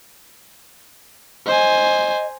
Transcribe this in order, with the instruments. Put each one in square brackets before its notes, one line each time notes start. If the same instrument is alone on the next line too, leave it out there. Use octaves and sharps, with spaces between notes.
[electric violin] C5 G#5 [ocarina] D#5